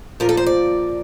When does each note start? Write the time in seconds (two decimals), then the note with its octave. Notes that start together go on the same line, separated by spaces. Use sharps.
0.20 A#2 F3 A#3 A#4
0.29 A4
0.37 C5
0.46 D5